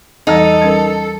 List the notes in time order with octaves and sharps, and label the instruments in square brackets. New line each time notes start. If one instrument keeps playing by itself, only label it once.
[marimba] E2 E3 G3 [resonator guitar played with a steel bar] D#4 [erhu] A4
[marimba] G3 C#4 A#4